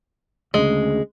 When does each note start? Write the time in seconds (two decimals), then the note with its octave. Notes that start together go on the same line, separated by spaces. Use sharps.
0.54 D2 C#3 G#3